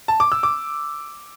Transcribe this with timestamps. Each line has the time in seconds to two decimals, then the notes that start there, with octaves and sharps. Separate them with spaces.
0.08 A5
0.20 D6
0.32 E6
0.43 D6